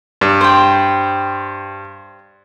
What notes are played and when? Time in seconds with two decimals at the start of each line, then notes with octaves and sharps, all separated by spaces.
0.21 G2
0.41 C5 G5